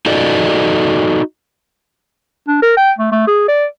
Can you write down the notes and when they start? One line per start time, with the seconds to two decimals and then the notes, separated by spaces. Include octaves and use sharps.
0.06 D#4 F#4 A4 D5 D#5
2.48 D4
2.62 A#4
2.77 G5
2.98 A3
3.12 A3
3.27 G#4
3.48 D5